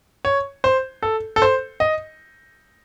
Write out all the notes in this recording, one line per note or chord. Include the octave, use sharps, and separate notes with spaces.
C#5
C5
A4
A4
C5
D#5